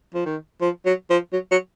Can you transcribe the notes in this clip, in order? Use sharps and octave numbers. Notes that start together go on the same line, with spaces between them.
F3
D#3
F3
F#3
F3
F#3
F#3